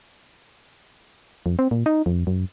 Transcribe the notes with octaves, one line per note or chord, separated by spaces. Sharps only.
F2
C4
A#2
D#4
F2
F#2